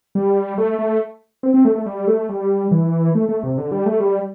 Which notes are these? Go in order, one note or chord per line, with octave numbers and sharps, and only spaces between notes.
G3
A3
A3
C4
C4
A3
A3
G3
A3
G3
E3
A3
A3
C3
D3
G3
A3
G3